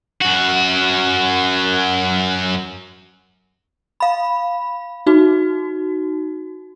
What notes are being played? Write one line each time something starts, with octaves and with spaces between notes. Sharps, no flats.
F#2 F#4
F5 B5
D#4 F#4